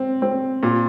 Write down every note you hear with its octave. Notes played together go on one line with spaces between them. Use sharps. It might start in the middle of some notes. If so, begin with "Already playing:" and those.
Already playing: C4
C4
A#2